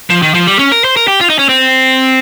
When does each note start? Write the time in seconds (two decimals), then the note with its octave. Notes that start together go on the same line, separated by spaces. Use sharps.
0.10 F3
0.22 D#3
0.34 F3
0.47 G3
0.59 C#4
0.72 A#4
0.84 C5
0.97 A#4
1.08 G4
1.21 F4
1.30 D#4
1.39 C#4
1.49 C4